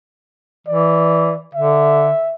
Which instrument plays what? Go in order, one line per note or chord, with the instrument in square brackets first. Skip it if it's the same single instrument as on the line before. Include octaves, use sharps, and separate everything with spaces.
[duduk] E3 [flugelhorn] D5
[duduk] D3 [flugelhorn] E5